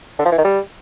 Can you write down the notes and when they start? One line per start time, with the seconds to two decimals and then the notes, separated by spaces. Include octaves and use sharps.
0.19 D3
0.25 F3
0.32 E3
0.38 D#3
0.45 G3